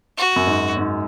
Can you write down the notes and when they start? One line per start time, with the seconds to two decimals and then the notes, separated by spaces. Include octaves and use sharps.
0.17 F#4
0.36 F#2
0.47 G#2
0.77 G#2